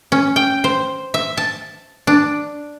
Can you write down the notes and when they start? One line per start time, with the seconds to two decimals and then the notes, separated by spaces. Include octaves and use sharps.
0.12 C#4
0.36 G5
0.64 C5
1.14 E5
1.37 A5
2.07 D4